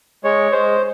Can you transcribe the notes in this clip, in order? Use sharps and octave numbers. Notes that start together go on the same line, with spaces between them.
G#3 C#5
G#3 C5